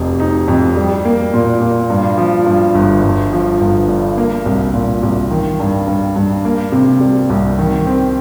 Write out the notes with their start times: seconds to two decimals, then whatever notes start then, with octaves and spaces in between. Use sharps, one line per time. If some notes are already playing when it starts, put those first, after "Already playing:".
Already playing: F1 F2
0.20 D#4
0.48 F2
0.77 G3
1.05 A#3
1.34 A#2
1.61 A#2
1.90 G2
2.18 F3
2.46 G2
2.75 G1
3.03 G1
3.32 F3
3.61 G1
3.88 G2
4.17 A#3
4.45 C2
4.74 A#2
5.03 C2
5.31 D#3
5.60 G2
5.87 G2
6.16 G2
6.45 A#3
6.72 C3
7.01 G3
7.30 C2
7.59 D#3
7.87 C4